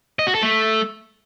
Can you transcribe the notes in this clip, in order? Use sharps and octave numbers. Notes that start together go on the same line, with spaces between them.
D#5
F#4
A4
A3